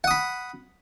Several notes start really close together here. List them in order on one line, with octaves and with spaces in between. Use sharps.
F#5 D#6 B5